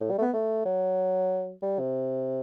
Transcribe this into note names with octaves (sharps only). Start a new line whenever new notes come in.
A2
G3
A3
B3
A3
F#3
G3
C3